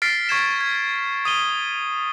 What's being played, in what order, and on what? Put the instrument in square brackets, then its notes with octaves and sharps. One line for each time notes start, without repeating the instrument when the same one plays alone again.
[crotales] F6 A6 B6 C7 D7
C#6 G#6 E7
G#6
D#6 D#7 G7